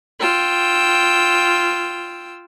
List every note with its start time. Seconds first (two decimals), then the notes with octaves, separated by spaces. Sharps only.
0.20 F4 G5 E6